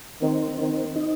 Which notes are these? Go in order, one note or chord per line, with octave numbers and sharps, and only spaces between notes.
D#3 C4
D#3 C4
D#4